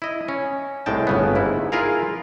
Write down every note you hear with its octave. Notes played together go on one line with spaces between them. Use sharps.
E4 D#5
C#4
C2 A2 G#3 G5 A5
G1 C#3 B3
G#2 E4
E4 F4 G#4 A#4 F5